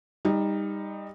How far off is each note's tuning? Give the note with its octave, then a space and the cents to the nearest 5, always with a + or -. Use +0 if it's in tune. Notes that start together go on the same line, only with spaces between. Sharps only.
G3 +25 D#4 +0